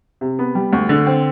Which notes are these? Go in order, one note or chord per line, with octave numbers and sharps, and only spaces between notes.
C3
B3
G3
D2
D3
C4